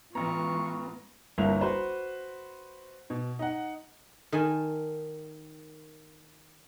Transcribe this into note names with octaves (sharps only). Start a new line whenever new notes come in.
A1 E3 G#3 B3 F4 A#5 C#6
G1 C2 A#3 E4 F7
F#4 B4 C5
B2
D#4 F#5
D#3 A#4 G#5 A5